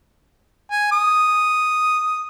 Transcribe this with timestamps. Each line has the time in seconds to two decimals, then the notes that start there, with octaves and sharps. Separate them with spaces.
0.71 G#5
0.91 D#6